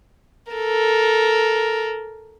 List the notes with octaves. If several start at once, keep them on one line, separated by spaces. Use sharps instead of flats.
A4 A#4